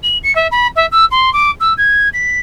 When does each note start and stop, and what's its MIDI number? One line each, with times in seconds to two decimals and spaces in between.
0.03 0.18 102
0.23 0.34 97
0.35 0.47 76
0.51 0.67 83
0.76 0.86 76
0.91 1.05 88
1.11 1.32 84
1.33 1.51 86
1.60 1.73 88
1.77 2.09 92
2.13 2.39 95